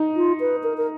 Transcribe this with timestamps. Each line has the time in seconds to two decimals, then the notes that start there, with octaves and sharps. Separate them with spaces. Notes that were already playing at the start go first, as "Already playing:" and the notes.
Already playing: D#4
0.16 F4
0.40 B4
0.63 A#4
0.77 A#4